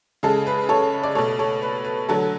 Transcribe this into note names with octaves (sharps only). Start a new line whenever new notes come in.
C#3 G#3 A4
B4
A4 C#5
D5
B2 A3 A4 C#5
A4 C#5
B4
B4
D3 F#3 A3 A4